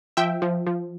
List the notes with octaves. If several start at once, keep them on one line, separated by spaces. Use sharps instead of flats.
F3 E5 G5
F3
F3